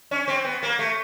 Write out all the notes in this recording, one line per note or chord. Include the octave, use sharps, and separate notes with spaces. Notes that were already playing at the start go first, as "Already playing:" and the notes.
C#4
C4
B3
A#3
A3